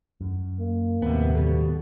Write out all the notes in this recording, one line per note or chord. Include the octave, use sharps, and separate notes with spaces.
F#2
A#3
D#2 A2 C3 D#3 F#3 B3
B2 G3 A4